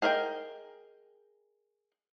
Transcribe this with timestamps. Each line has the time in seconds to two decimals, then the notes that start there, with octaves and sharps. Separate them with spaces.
0.02 G#4 A#4 D#5 E5 G5